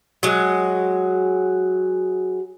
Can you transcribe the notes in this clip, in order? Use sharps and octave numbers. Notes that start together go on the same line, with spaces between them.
F#3 G#3